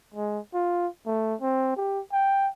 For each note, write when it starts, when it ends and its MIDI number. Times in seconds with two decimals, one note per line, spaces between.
0.14 0.39 56
0.54 0.87 65
1.06 1.35 57
1.41 1.76 60
1.77 2.00 67
2.12 2.48 79